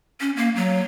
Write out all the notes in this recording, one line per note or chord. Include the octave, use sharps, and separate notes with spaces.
C#4
A#3
F#3